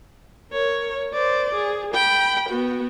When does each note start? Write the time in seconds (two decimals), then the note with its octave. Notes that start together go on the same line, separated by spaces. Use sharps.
0.51 A#4 C#5
1.13 C5 D5
1.54 G#4
1.94 G5 B5
2.49 B3 F#4